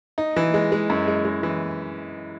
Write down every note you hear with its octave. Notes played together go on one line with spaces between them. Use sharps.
D#4
E3
G#3
G#3
F#2
G#3
G#3
E3